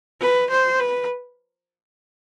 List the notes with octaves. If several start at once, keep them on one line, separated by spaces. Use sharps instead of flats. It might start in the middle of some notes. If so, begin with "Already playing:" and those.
B4
C5
B4